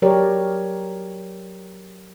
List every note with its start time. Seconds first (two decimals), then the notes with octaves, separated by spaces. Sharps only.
0.02 F#3 G4 A#4 C#5 D5